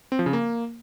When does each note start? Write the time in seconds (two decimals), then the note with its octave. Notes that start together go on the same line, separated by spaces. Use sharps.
0.12 C4
0.19 F3
0.26 C#3
0.33 A#3